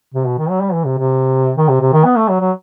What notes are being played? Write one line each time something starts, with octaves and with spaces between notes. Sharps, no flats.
C3
B2
D#3
F#3
G3
E3
C3
C3
D#3
C3
C3
D#3
B3
A3
F#3
F#3